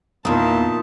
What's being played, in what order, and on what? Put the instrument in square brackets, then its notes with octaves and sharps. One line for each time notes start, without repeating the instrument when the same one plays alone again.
[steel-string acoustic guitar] E2 A#3 [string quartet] A#2 D#3 E3 [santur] D#4 F4 [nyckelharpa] A5